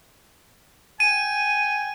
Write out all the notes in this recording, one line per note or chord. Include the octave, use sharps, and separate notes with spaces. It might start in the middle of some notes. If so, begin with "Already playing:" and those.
G5 G#5 D#7